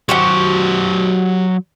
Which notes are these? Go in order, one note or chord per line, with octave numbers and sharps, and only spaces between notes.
F#3 F#4 G4 C5 F#5